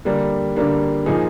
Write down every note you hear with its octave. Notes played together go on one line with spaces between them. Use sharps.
D3 G3 A#3 D4
D3 G3 A#3 D4
A#2 F3 A#3 D#4 G#4